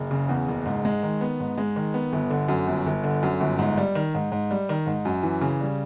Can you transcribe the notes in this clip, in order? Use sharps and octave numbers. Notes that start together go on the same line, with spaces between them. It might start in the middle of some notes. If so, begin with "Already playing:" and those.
Already playing: F#1
C#3
E2
F#1
G#2
G#3
D#3
B3
G#2
G#3
D#3
B3
G1
D3
F#2
G1
G1
D3
F#2
G1
G#2
G3
D#3
G#2
G#2
G3
D#3
G#2
F#2
E3
C#3
G3